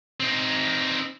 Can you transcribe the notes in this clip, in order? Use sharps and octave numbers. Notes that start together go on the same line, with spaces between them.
C4 D#4